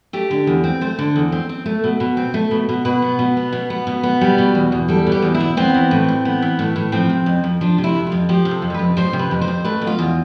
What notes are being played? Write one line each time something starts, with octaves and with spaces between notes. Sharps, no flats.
A3 G4
D3
E2
C4
A3 C5
D3
E2
C4
C4
A3
B2
B2
C4
A3
B2
B2
B2 B4
B3
B2
B3
B2
B3
B2
B3
G3
B2
E2
E2
G3 A4
B2
G4
E2
E4
E2
B3 C4
E3
A2
A2
B3
E3
A2
A2
F3 C4
C3
F2
F2
F3 D4
C3
E4
F2
F4
F2
F3 G4
C3
A4
F2
A4
F2 B4
F3 C5
C3
B4
F2
C5
F2
A3 B4
B2
F4
E2